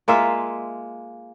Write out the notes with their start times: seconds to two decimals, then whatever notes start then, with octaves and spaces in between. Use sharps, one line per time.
0.08 G#3 A#3 F4 E5